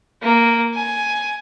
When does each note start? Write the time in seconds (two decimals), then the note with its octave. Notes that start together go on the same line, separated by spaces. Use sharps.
0.23 A#3
0.74 G#5